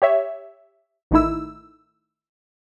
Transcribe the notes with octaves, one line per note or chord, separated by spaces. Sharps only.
G4 C#5 E5
A1 D#3 A3 D#4 E4 E6